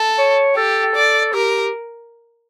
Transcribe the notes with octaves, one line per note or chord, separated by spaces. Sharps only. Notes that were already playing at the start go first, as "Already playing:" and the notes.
Already playing: A4
C#5
G4 A4
D5
G4 A#4